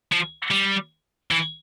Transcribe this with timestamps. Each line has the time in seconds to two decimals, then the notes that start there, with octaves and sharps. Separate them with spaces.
0.12 F3
0.51 G3
1.31 E3